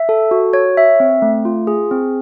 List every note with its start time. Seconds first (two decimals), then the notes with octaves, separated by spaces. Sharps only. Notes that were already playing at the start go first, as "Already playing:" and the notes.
Already playing: E5
0.09 A4
0.31 F#4
0.53 C#5
0.77 E5
1.00 C4
1.22 A3
1.45 F4
1.67 G#4
1.91 C4